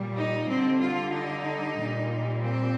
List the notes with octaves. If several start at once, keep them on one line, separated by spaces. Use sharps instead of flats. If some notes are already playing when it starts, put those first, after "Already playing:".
Already playing: A#2 G3
D#4
D3 G3 C4
F4
D#4
A#2 G3
C4